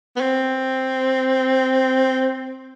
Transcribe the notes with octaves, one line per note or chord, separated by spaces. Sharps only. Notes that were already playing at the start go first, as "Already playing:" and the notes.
B3
C4